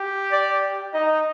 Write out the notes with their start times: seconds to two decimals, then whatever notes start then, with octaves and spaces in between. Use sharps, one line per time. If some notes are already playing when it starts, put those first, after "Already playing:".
Already playing: G4
0.32 D5
0.93 D#4 D#5